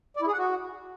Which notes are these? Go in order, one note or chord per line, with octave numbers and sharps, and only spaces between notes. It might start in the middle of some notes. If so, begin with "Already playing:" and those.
D5
E4
G#4
F#5
F#4